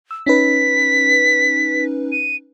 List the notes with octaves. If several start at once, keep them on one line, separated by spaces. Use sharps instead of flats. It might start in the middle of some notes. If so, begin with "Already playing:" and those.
E6
C#4 D#4 B4 B6
D#7